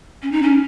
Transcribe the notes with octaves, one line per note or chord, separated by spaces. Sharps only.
C#4
D#4
C#4